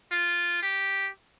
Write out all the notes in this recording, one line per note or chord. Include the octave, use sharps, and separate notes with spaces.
F4
G4